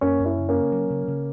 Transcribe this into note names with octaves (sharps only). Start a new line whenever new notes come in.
F#2 A#3 C#4
F#2
C#4 E4
C#3
A#3 C#4
C#3
F#3
C#3
C#3